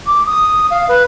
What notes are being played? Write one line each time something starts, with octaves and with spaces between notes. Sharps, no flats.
D6
D#6
F5
B4